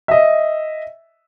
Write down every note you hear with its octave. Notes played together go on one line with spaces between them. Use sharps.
D#5 E5